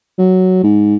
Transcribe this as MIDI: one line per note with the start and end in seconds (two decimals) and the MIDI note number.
0.18 0.59 54
0.64 0.96 44